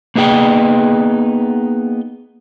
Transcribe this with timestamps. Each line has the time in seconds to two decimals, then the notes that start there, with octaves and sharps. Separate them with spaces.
0.16 A#3 B3 D#4 G#4 G5